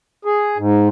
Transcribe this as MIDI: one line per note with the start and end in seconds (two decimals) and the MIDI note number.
0.25 0.58 68
0.58 0.88 44